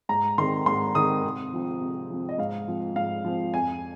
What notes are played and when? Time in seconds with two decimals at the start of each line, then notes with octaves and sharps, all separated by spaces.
0.09 G#2 A#5
0.38 D#3 G#3 C4 C6
0.66 G#2 C6
0.95 D#3 G#3 C4 D#6
1.24 C3
1.53 F3 C4
1.81 C3
2.10 F3 C4
2.29 D#5
2.38 G#2 F5
2.68 F3 C4
2.96 G#2 F5
3.24 F3 C4
3.53 F2 G#5